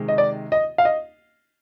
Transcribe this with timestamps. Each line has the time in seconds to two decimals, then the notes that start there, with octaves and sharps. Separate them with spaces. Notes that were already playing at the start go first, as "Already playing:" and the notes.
Already playing: C3 D#3 G#3
0.08 D#5
0.18 D5
0.52 D#5
0.78 F5
0.85 D#5